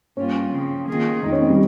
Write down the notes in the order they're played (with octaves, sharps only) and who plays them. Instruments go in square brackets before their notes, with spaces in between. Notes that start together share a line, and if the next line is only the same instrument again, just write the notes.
[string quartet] G2 G3 A#3 F4 [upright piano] C#4
[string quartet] C#3 F3 C4
D#3 A#3 F4 G#4
[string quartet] F2 D#3 G#3 [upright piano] D#4
[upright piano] C#4
C4
G3